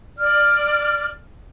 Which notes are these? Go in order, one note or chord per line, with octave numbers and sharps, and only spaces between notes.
D5 F6